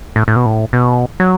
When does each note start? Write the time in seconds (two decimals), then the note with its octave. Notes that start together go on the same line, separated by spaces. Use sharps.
0.16 A2
0.28 A2
0.36 B2
0.46 A2
0.73 B2
1.20 F#3